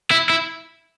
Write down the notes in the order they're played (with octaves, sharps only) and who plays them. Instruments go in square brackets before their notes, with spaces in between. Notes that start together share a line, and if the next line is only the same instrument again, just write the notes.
[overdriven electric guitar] E4
E4